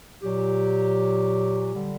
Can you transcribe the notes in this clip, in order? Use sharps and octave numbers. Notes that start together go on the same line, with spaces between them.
A#2 F#3 G4
D3 G3